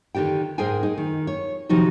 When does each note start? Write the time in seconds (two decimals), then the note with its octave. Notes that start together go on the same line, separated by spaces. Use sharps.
0.15 D3 D#3 D4 G4 G5
0.58 G#2 G#4 A#4 C5 G5 G#5
0.83 D#4 G#4
0.98 D#3
1.27 C#5
1.69 C3 D#3 F3 D#4 F#4 G4